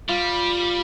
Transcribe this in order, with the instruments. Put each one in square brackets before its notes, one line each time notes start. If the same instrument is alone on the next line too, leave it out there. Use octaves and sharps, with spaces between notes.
[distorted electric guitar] G3 [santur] F4